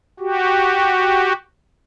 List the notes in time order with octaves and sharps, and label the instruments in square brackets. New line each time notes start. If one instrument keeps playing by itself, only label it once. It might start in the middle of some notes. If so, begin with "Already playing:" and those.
[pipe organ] F#4 G4